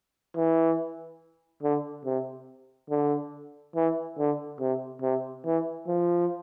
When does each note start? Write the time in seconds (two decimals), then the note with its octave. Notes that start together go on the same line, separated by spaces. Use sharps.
0.36 E3
1.63 D3
2.05 C3
2.90 D3
3.76 E3
4.18 D3
4.61 C3
5.02 C3
5.46 E3
5.88 F3